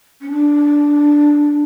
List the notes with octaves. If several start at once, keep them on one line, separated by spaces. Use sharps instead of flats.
C#4
D4